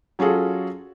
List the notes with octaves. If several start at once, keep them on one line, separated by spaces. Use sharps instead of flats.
F#3 C#4 F4 F#4 G#4 A4